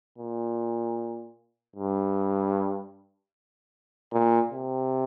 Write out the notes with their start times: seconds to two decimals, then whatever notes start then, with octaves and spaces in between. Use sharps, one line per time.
0.18 A#2
1.76 G2
4.13 A#2
4.51 C3